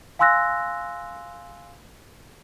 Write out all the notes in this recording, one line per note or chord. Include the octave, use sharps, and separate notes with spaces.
F5 G#5 C6 E6 F#6 A#6